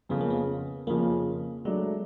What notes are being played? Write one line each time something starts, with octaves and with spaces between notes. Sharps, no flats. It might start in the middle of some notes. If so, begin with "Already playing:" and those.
F2 C#3 F3 B3
A#3
B3
F2 C#3 F3 A#3
F#3 G#3 A3 D4